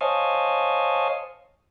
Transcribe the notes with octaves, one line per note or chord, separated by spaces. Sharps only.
C5 C#5 D#5 F5 G#5 A5